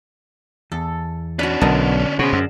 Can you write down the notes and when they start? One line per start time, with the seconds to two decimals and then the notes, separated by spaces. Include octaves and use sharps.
0.72 E2 A4
1.39 C#4 D4 F#4 B4
1.61 B1 D3 A#4 D#5 A5
2.19 B2 C#4 F#4 G#4 C5 C#5
2.33 F#2